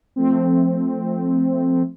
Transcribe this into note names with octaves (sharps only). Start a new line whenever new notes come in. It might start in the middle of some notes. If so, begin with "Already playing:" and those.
F3 A3 C4